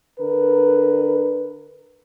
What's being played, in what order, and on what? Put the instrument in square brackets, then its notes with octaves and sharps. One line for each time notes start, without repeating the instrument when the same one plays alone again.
[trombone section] D3 A#4 B4